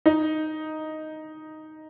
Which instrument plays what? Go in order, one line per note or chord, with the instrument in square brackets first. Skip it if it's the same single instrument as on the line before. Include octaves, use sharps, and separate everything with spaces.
[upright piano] D#4